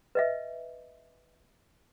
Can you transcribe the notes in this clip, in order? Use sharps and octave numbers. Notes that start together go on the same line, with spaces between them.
B4 D#5 E5